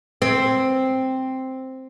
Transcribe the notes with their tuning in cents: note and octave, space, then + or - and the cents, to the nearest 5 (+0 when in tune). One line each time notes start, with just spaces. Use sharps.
C4 +0